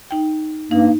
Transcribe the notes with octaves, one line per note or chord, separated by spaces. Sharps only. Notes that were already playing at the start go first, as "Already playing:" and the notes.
D#4 G5
G2 A#3 D#4